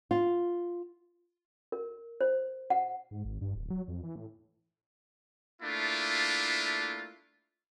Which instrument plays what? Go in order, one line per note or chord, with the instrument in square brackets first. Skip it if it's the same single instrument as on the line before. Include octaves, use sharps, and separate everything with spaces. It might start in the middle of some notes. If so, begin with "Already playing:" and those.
[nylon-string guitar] F4
[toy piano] A#4
C5
F#5
[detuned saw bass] G#2
G#1
G2
D1
F#3
F2
E3
A2
[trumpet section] A3 A#3 D4 E4 F4